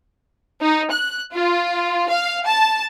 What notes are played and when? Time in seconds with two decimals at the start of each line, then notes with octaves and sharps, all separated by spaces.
0.62 D#4
0.91 F#6
1.33 F4
2.10 F5
2.46 A5